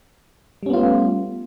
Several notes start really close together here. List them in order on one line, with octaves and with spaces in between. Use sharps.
G3 C#4 B3 F4 A3